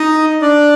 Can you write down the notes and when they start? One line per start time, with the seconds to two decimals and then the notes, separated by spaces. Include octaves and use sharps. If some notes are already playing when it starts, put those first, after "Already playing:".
Already playing: D#4 D#5
0.42 D4 D5